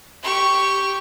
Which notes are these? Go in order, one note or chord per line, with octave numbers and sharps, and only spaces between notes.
G4 C#6